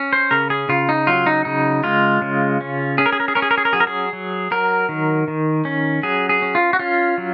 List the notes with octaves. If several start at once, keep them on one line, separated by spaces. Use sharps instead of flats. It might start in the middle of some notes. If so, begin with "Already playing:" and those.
Already playing: C#4
C5
C#3 A#4
G#4
C#3 F4
D#4
F#3 F4
D#4
C#3 D#4
G#3 F4
C#3
C#4
C#4 G#4
A#4
G#4
A#4
G#4
C#4 A#4
G#4
A#4
G#4
A#4
F#3 G#4
A#4
G#4
F#3
F#3 A#4
D#3
D#3
C#4
F#3 G#4
G#4
C#4
F4
F#4
C#4 F4
F#3